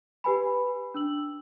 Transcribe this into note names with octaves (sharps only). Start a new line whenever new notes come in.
G4 B4 G#5 B5
D4 E6 F#7